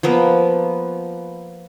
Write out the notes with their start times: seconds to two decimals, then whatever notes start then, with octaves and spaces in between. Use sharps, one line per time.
0.03 F3 A#3 B3